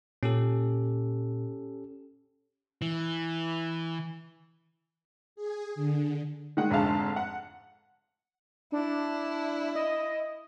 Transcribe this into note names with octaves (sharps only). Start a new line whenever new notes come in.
A#2 C#4 G4 A4
E3
G#4
D3
D#3 G#3 F#5
F1 G#2 D3 G#4 F5 A5
F#5
D4 E4
D#5